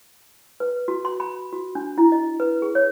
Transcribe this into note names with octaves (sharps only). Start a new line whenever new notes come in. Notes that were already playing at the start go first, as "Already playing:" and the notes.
B4
F#4
C6
B5
F#4
D4
E4
D#5
B4
G#4
C#5